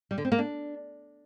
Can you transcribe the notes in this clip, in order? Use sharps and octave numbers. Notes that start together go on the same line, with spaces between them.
G3
D3
C4
A#3
D4